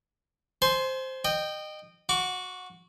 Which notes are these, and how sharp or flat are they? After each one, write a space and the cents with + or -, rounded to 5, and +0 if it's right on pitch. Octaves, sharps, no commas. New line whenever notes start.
C5 +0 G#5 +35 C6 +0
D#5 -25 G5 +0
F#4 -15 D6 -40